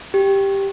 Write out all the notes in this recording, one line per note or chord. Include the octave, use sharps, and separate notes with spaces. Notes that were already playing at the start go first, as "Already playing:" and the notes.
G4